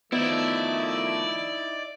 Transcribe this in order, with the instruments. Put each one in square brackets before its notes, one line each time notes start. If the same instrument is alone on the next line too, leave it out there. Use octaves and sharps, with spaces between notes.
[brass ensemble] D#3 F3 A3 [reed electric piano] B3 [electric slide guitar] D#4 E4 [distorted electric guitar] D5